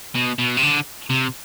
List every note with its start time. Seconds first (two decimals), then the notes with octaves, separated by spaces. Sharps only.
0.15 B2
0.39 B2
0.57 C3
0.62 D3
1.10 C3